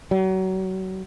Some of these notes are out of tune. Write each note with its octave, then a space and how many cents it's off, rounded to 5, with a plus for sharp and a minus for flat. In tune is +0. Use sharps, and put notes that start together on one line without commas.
F#3 +30